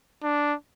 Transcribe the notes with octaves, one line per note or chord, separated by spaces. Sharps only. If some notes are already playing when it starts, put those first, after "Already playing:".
D4